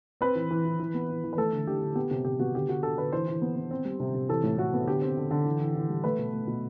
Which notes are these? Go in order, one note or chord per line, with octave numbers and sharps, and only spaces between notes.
C4 B4
E3
E3
E3
E3
B3
E3
E3
B4
A3 A4
D3
D3 G4
D3
B3 G4
C3 G4
C3 G4
B3 F#4
D3 G4
D3 F#4
D3 A4
D3 B4
E3 C5
E3
B3
B3
C4
G3
C3
C3
E3 A4
A2
A2 F#4
B3
D3 G4
C4
D3
D3
E3
E3
E3
G3
A3 B4
B2
A3
B2